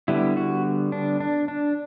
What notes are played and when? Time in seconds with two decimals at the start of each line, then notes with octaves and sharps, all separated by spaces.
0.08 D3 G3 B3 E4
0.37 F#4
0.92 D4
1.20 D4
1.48 D4